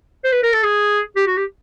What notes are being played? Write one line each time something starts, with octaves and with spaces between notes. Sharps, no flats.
C5
B4
A#4
A4
G#4
G4
F#4
G4